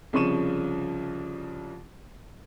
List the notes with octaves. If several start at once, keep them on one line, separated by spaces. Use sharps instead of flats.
C2 C#3 F3 C#6 D#7 E7